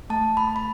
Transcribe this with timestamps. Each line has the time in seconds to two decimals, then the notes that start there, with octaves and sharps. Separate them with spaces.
0.10 A3 A5
0.37 A3 B5
0.56 B5